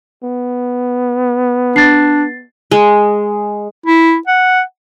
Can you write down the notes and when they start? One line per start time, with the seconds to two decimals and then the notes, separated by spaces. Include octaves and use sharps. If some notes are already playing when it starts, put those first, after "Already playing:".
0.23 B3
1.76 D4 A6 C7
2.71 G#3
3.86 E4
4.27 F#5